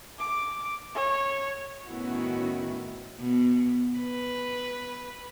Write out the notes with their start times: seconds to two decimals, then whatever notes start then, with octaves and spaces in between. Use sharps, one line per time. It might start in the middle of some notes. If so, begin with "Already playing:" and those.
0.19 D6
0.95 C#5
1.87 A2 D#3 B3 C#4 E4 F#4
3.19 B2
3.99 B4